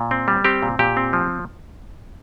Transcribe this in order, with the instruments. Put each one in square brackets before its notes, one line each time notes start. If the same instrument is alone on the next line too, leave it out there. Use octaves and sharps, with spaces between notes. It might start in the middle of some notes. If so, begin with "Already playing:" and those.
Already playing: [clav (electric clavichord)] A#2
C4
G3
C4 G4
A#2
A#2 G4
C4
F3